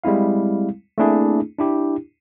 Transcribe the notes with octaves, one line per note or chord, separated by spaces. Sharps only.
G3 G#3 C4 E4 F5
A3 A#3 C4 D4 E4 G#4
D4 E4 G4